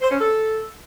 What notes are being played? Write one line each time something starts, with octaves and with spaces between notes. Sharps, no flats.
C5
C#4
A4